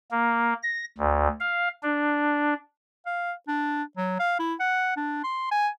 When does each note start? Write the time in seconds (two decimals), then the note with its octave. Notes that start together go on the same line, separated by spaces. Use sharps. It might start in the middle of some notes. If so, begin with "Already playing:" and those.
0.11 A#3
0.63 A#6
0.98 D2
1.40 F5
1.83 D4
3.06 F5
3.48 D4
3.97 F#3
4.19 F5
4.39 E4
4.60 F#5
4.97 D4
5.24 C6
5.52 G#5